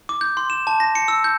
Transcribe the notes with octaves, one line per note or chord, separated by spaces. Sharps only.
D6
G6
C6
E7
A5
A#6
C#7
E6
G6